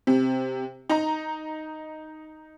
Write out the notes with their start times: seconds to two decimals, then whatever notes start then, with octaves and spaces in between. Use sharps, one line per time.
0.07 C3
0.89 D#4 A#5